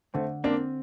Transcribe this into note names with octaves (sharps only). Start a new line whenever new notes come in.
D3 A3 C4
A#3 C4 D4